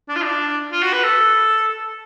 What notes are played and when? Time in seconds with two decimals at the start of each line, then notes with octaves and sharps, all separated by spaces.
0.09 D4
0.16 F4
0.24 D4
0.72 F4
0.83 F#4
0.93 B4
1.04 A4